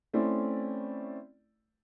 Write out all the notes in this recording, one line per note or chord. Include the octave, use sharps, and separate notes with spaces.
A3 C4 C#4 E4 D5